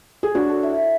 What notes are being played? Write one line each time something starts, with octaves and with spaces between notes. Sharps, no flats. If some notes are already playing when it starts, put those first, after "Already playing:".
G#4
D4 F#4 C#5
A4
E4
E4